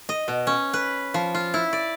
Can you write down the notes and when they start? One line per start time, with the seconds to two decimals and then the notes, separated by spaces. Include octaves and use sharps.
0.09 D#5
0.28 B2
0.47 C#4
0.73 B4
1.14 F3
1.34 F4
1.54 E4
1.73 D5